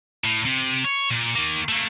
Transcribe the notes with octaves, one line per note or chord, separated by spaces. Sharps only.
A2
C3
C#5
A#2
D#3 A#3
A3 A#3